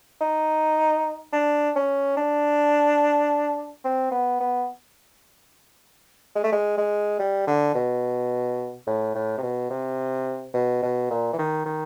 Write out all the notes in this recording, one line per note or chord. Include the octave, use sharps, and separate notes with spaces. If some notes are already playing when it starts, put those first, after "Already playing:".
D#4
D4
C#4
D4
C4
B3
B3
G#3
A3
G#3
G#3
G3
D3
B2
A2
A2
C3
B2
C3
B2
B2
A#2
E3
D#3
D#3